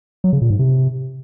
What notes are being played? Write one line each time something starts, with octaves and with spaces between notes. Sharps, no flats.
F#3
C#3
A#2
G#2
C3